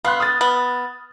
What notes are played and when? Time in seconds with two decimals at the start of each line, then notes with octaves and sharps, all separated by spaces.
0.05 B3 F5 C6 F#6
0.20 D#6 F6 A6
0.41 B3